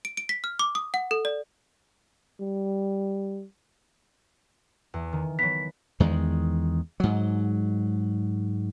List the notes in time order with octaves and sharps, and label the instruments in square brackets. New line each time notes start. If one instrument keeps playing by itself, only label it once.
[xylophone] D7
D7
B6
F6
D6
D#6
F#5
A4
D5
[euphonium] G3
[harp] E2
D#3
[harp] F#3 B3 [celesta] B6
[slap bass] E2 D#3 G#3
G#2 F#3